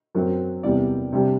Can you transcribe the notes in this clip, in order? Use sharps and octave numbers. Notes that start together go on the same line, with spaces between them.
F#2 F#3 C4
E2 C3 G3 B3 D5
C3 G3 D4